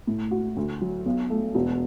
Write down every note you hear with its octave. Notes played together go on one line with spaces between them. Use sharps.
A2
F#4
D2
F#3
B1
A3
E1